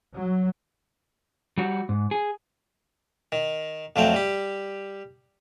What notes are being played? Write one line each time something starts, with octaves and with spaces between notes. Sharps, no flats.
F#3
G3 F#4
G#2
G#4
D#3
F2 F3 F#3 A3 G5
G3 G4